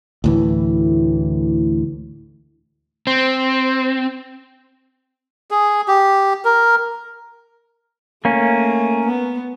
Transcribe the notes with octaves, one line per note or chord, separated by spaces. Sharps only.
D2 A2 E3
C4
G#4
G4
A#4
A3 A#3 C#4
B3